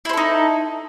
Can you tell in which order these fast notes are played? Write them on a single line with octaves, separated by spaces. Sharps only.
E4 C5 A4 D#4